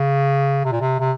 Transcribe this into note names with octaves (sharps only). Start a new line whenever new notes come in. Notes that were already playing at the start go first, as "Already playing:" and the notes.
Already playing: C#3
C3
A#2
C3
C3